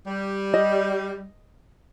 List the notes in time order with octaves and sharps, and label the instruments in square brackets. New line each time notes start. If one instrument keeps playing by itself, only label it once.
[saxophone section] G3
[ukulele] D#5